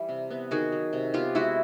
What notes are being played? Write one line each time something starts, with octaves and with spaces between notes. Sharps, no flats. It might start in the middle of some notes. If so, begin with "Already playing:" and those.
Already playing: E3 G3
C3
B3
D#3 F#4 G#4
F#3
C3
B3 F4 G4
G#3 E4 F#4